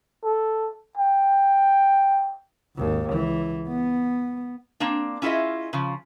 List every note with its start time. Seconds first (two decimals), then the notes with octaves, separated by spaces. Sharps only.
0.24 A4
0.97 G5
2.77 G#1 D#2
3.10 C#2 E3
3.68 B3
4.80 A#3 C4 D4
5.22 C#4 E4 F4 G#4 D#5 E5
5.73 C#3 F3